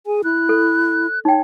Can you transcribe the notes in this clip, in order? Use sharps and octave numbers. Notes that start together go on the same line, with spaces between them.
G#4 G#5
E4 F#6
A4
D#4 C#5 G5